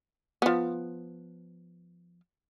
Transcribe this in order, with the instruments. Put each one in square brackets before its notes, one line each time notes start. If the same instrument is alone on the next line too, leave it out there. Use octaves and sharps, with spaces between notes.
[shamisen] F3 B3